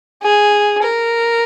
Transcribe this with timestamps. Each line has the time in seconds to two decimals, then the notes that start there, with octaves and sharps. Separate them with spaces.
0.22 G#4
0.82 A#4